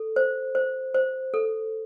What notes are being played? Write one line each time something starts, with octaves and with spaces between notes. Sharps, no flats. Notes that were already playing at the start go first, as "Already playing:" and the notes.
Already playing: A4
C5
C5
C5
A4